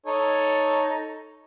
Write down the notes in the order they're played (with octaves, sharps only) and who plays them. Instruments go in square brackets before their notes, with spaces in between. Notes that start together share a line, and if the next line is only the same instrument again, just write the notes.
[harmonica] D#4 A4 C#5